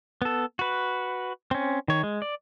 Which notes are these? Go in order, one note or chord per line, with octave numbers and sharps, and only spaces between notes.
B3 A4
F#4 B4
C4 C#4
D#3 C#5
G#3
D5